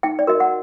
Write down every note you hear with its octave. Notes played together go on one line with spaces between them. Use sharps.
D#4 G5
D5
F#4 A#4 D#5
F#5